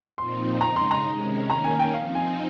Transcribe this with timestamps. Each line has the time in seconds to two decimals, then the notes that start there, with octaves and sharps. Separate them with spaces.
0.17 A#2 F3 C4 D#4 C6
0.61 C#3 G#3 D#4 A#5
0.76 C6
0.91 A#5
1.05 C3 D#3 G#3 C#4
1.49 D#3 A#3 C#4 A#5
1.64 G#5
1.79 G5
1.94 F3 C4 D#4 F5
2.15 G#5